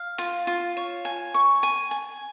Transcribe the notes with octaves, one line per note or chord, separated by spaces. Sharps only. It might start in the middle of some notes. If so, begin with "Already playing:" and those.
Already playing: F5
F4
F4
C#5
G#5
C#6
G#5
G#5